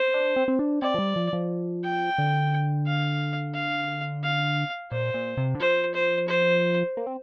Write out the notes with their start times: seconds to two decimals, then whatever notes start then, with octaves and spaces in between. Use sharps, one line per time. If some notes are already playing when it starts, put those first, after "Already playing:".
Already playing: C5
0.14 D4
0.36 C4
0.48 C4
0.59 D4
0.82 C4 D5
0.94 F3
0.99 G3
1.16 F3
1.33 F3
1.84 G5
2.18 D3
2.87 F5
3.54 F5
4.23 F5
4.91 A#2 C5
5.14 A#2
5.37 C3
5.55 D3
5.60 F3 C5
5.94 C5
6.28 C5
6.97 A#3
7.06 C4